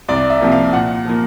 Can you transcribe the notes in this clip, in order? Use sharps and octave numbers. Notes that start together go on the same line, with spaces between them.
C2 D5
E5
C3 F3 A#3
F5
A#2 F#5
F3 A#3